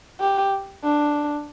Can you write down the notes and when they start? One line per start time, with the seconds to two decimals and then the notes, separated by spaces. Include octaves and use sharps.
0.20 G4
0.84 D4